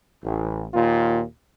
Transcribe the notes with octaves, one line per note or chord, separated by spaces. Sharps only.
A1
D#2 A#2 F4